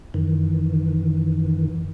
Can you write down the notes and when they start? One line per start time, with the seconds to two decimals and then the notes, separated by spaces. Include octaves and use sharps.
0.14 F#2 D#3 E3